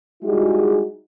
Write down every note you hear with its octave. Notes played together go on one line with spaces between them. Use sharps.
G3 G#3 D#4 E4 F#4 G#4